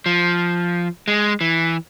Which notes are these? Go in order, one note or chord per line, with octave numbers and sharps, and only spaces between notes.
F3
G#3
E3